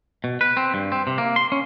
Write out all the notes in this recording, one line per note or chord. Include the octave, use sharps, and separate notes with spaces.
B2
B4
C4
G2
C4
C3
A#3
C6
C#4